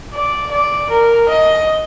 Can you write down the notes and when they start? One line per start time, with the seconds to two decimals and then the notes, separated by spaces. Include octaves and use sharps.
0.13 D5
0.51 D5
0.89 A#4
1.28 D#5